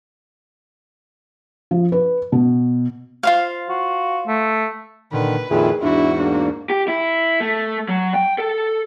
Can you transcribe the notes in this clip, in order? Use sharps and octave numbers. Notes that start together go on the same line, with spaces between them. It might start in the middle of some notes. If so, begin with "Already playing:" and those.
F3
B4
B2
F4 C5 F5
F#4
A3
A#2 D3 D#3 B4
F2 A#2 D#3 E4 G#4
E2 G#2 D4 E4 F#4
A#3 D4
G4
E4
A3
F#3
G5
A4